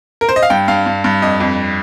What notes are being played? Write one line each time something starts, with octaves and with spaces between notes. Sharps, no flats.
A#4
C5
D#5
F5
G2 G5
G2 F5
G2
G2
F2 D#5
F2